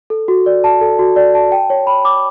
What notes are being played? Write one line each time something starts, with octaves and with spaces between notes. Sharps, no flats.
A4
F#4
D5
A5
A4
F#4
D5
A5
G5
C#5
B5
D6